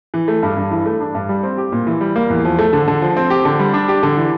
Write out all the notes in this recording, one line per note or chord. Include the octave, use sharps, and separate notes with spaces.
E3
A3
G2
G2
E3
A3
D4
G2
G3
C4
G4
A#2
E3
G3
A#3
E2
F3
A3
D3
D3
F3
C4
G4
D3
G3
D4
G4
D3
E3